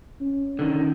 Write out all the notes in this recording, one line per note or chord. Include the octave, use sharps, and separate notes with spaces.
C#4
D3 D#3